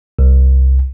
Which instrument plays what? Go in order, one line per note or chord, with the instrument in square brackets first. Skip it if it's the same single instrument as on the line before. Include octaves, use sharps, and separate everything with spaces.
[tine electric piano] C2